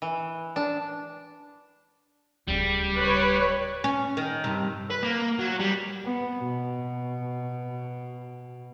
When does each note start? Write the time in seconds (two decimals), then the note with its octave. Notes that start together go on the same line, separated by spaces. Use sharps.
0.02 E3
0.56 D4
2.48 D1 C#3 G3
2.97 B4 C#5
3.84 C#4
4.17 D#3
4.44 G2 C3 D#4
4.90 B4
5.03 A#3
5.39 F#3
5.60 G3
6.05 B3
6.41 B2